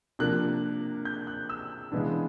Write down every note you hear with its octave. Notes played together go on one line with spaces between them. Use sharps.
C3 F3 A#3 D4 F#6
G6
F#6
E6
C#3 E3 G#3 B3 D4